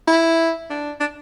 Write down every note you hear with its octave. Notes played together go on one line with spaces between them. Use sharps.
E4
D4
D4